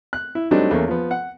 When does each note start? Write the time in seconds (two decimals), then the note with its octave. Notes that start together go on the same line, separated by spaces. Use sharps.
0.13 F#6
0.35 E4
0.51 F#3 G3 A3 C4 D4 D#4
0.71 E2 A3 A#3 C#4
0.88 F3 B3
1.11 F#5